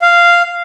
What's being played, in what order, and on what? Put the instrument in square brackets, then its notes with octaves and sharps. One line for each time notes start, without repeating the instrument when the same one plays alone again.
[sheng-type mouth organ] F5